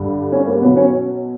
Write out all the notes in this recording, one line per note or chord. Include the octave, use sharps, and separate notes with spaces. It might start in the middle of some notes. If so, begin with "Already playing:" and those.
Already playing: G2 D3 G3
C#4
A#3
B2 F#3 B3
C#4